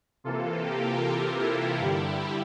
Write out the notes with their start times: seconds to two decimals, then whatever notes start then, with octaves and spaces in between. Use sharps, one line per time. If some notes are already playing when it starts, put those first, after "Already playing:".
0.24 C3 E3 A#3 F4 A4
0.63 G4 A#4
1.02 G4 A#4
1.41 E4 G4
1.80 G2 D3 G3